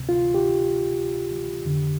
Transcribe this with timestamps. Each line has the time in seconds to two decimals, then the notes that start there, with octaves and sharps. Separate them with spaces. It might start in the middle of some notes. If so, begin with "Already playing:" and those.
Already playing: D2 C3
0.09 F4
0.34 G4
1.65 F2 D3